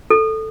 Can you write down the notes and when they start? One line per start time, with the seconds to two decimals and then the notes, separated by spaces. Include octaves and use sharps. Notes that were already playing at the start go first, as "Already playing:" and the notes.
0.10 A4